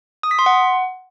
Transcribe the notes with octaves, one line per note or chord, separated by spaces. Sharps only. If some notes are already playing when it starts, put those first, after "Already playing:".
D#6
B6
C6
F#5